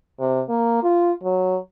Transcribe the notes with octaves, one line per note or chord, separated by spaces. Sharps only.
C3
A#3
F4
F#3